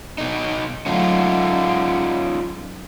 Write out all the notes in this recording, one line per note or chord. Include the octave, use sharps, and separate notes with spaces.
B2 D#4
D3 F#3 A3 C#4 D#4 F4